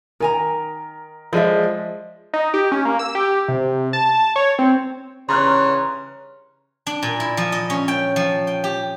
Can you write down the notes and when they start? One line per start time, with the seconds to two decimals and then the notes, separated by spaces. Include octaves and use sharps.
0.20 D#3 A#4 G#5 A#5
1.33 F3 G#3 D5 E5
2.33 D#4
2.54 G4
2.72 C#4
2.85 A#3
2.99 E6
3.15 G4
3.48 C3
3.93 A5
4.36 C#5
4.59 C4
5.29 G2 C#3 E3 C#5 A#5 C6 F6 F#6
6.87 D4
7.03 A#2
7.20 E4
7.37 F3
7.52 D#5
7.70 C#4
7.88 G5
8.16 F3
8.47 G5
8.64 G4